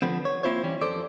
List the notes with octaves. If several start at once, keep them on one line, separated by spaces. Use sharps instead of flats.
D3 F3 B3 C4
C#5
A#3 C4 E4 F4 C5 C#5
E3 G3 C#4
F2 A4 C5 D5